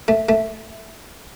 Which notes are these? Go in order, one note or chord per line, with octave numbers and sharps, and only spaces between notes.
A3
A3